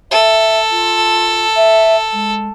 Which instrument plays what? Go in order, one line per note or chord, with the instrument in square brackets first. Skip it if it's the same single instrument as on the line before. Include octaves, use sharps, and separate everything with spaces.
[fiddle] A4 [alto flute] E5
[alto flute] F4
E5
G#3